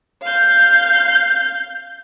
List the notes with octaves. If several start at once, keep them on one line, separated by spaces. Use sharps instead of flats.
F5 G6